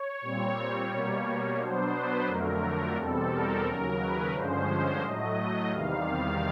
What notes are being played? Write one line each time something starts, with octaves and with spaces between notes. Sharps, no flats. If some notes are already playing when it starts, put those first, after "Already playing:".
Already playing: C#5
A#2 G3 C4
B2 G3 A#3
B2 F#3 B3 D4 C5
B4
F2 D3 F#3 A3 A#4
E2 B2 G3 C4 A4
A#4
D#2 C#3 F#3 A#4
B4
G2 D3 F3 G#3 C#4 C5
A2 F#3 A3 D#5
E2 C3 D#3 G3 F5